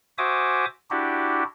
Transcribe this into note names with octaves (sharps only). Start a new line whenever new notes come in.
F#4 C5 E5 G#5 D6 D#6
D4 E4 F#4 G4